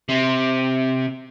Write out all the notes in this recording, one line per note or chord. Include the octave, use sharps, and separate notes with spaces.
C3